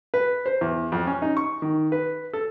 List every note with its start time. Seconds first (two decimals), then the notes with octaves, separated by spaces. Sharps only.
0.14 B4
0.46 C5
0.61 E2
0.92 F2
1.07 C#4
1.22 D#4
1.37 C#6
1.62 D#3
1.92 B4
2.33 A4